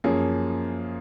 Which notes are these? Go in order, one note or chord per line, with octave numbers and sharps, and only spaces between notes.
F#2 F3 A#3 C#4 G#4